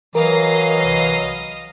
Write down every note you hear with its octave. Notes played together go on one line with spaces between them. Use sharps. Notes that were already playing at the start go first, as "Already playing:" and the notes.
E3 F#3 A#4 D#5 F5
C2